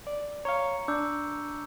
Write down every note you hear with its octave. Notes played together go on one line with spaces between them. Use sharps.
D5
C#5 F5 A#5 C#6 C#7
D4 D6 E6 G6